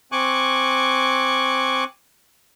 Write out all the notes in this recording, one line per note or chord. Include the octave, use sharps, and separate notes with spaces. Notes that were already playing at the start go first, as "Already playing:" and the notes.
C4 G#5 C#6 D6 F#6